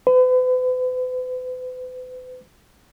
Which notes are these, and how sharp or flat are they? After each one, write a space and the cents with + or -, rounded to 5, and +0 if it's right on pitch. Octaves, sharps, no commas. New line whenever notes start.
B4 +40